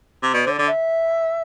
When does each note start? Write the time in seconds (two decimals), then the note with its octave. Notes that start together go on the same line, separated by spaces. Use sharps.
0.23 C3
0.33 B2 D5
0.45 D3 C5
0.50 D5
0.59 D3
0.66 E5